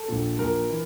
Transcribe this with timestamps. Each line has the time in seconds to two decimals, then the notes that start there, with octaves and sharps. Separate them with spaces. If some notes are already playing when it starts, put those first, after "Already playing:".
Already playing: A4
0.08 A#1 A#2
0.39 A#1 A#2 A#4
0.70 E3